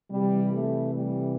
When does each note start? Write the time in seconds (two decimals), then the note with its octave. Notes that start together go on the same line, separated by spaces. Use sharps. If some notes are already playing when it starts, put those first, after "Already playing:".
0.11 C3 E3 G3
0.52 A3
0.94 G3